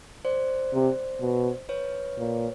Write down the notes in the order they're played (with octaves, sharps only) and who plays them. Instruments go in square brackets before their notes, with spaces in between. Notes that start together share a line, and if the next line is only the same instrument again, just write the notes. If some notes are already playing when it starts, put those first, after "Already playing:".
[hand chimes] C5 D5
[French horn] C3
B2
[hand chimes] B4 C#5
[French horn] A#2